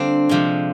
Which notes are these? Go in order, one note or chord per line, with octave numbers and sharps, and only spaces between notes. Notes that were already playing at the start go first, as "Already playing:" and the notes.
Already playing: D3 G3 C4 D4 F4
C3 F3 G#3